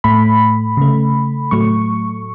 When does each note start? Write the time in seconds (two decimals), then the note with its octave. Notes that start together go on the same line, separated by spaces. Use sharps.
0.04 A2 A3 B5
0.77 C#3 A3
1.51 A2 F#3 A3 C#6